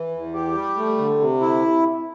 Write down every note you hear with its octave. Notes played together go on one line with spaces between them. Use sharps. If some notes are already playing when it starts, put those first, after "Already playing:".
Already playing: E3
E2
G4
G3
A3
D3
C3
E4